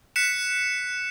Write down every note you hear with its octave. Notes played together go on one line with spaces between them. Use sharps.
F#6 B6 C#7 E7